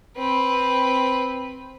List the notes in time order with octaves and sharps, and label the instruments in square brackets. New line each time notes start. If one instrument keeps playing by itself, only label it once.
[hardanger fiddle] C4 B4